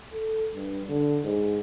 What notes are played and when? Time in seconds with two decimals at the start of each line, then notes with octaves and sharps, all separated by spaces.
0.12 A4
0.54 G2
0.89 D3
1.24 G#2